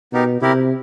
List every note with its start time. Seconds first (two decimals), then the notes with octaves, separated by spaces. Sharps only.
0.13 B2 B3 D#4 G4 A#4
0.42 C3 E4 G4 A#4